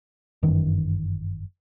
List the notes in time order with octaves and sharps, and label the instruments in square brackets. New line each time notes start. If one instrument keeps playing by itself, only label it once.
[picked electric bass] G1 F#2 D#3 E3